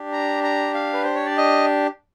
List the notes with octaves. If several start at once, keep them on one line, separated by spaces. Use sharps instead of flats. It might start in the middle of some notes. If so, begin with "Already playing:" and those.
Already playing: D4 G4
A#5
A#5
F5
B4
C5
C#5
D5
D#5